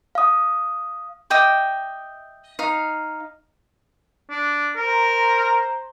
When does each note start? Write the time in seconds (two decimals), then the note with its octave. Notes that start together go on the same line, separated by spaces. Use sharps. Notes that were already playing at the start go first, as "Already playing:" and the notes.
0.15 F5 D#6
1.30 D#5 E5 G5 D6
2.59 D#4 F5
4.30 D4
4.76 A#4 C5 A#5